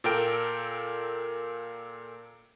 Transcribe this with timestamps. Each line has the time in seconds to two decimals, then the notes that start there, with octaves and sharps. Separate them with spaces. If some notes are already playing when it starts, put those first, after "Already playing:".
0.04 A#2 A4 A#4 G5 D7